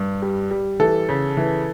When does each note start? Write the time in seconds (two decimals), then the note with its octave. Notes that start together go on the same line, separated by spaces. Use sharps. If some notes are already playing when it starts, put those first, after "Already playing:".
Already playing: G2
0.22 G3
0.51 G3
0.80 E3 A4
1.09 C#3
1.37 E3